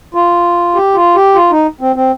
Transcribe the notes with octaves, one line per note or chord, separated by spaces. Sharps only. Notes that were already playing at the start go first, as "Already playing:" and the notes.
F4
G4
F4
G4
F4
D#4
C4
C4